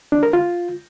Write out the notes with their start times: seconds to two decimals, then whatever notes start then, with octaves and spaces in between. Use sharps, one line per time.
0.12 D4
0.23 A#4
0.33 F4